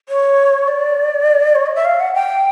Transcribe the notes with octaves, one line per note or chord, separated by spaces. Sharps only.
C#5
D5
C#5
D#5
E5
F5
F#5
G5